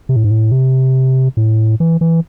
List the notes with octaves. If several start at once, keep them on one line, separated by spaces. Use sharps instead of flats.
C3
A2
G#2
A2
C3
A2
E3
E3